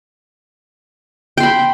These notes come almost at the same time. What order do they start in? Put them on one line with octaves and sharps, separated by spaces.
G5 C6 B5